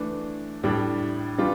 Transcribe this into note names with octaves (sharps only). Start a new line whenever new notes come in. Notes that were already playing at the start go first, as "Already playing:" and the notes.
Already playing: E3 A3 D4
A2 G3 D4
E3 G3 D4 F4